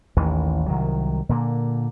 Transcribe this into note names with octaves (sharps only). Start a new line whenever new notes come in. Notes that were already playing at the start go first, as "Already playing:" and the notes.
A1 D#2 D#3 E3
C2 D#3 F#3
A#2 D3 A#3